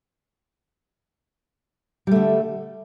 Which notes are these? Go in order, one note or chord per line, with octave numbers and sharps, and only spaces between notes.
D3 G3 A3